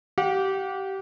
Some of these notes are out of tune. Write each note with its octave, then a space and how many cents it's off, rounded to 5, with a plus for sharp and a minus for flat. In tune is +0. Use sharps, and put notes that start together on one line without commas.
G4 -20 F#5 -45